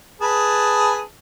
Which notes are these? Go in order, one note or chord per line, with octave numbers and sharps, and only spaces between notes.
G#4 B4 A5